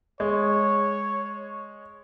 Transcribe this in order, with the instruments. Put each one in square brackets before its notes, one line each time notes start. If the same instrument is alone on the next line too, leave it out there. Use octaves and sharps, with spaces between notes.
[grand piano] G#3 [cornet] C#5